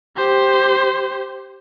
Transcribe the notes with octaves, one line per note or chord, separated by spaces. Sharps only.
G4 C5